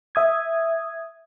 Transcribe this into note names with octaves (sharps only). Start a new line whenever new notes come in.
E5 D#6 G#6